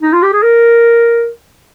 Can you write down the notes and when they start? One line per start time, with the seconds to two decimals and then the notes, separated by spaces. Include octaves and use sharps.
0.02 D#4
0.13 F4
0.23 G4
0.33 G#4
0.43 A#4